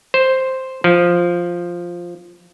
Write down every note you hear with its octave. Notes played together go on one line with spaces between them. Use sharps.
C5
F3